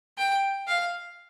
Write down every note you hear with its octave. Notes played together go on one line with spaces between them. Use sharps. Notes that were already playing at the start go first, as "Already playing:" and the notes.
G5
F5